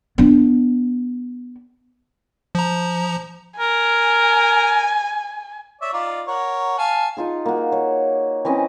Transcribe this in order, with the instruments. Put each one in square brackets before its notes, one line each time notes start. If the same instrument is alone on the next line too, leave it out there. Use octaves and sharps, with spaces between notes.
[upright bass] B3 D4
[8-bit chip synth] F3 A#5
[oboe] A#4 [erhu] G#5
[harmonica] C#5 D5 E5
D#4 F4 D5
A#4 C#5 F#5
F5 G#5 A5
[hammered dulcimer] D#4 F4 G#4
A#3 F#4
C#5
E3 C4 C#4 D#5